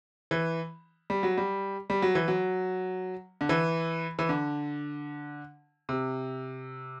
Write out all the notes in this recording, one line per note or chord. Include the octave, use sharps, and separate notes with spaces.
E3
G3
F#3
G3
G3
F#3
E3
F#3
D3
E3
E3
D3
C3